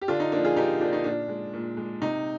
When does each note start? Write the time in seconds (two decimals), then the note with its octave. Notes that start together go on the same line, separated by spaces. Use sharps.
0.02 G4
0.08 D3 D4 F4
0.20 D#4
0.32 F3 A#3 D4
0.45 F4 G#4
0.56 D3 D#4 G4
0.81 F3 D4
0.85 A#3
0.93 D#4
1.04 A#2 D4
1.29 G#3
1.53 A#2
1.77 G#3
2.01 C3 D#4